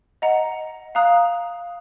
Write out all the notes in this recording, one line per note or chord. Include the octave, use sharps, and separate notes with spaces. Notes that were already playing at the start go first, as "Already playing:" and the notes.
D#5 F#5 A#5
F5 A#5 D#6 F#6